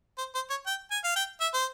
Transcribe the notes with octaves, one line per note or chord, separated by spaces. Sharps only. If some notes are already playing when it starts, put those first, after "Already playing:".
C5
C5
C#5
G5
G#5
F5
G5
E5
C5